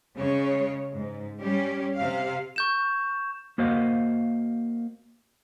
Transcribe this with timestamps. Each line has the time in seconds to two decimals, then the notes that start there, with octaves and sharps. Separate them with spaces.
0.16 C#3 G#3 C#5
0.94 G#2
1.40 G3 C#4 G4
1.97 C3 F5
2.56 C#6 G6 E7
3.58 A#3 F#4 C5 D#5 F5